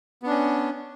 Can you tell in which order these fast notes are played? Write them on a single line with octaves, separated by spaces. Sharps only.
B3 D4 C#4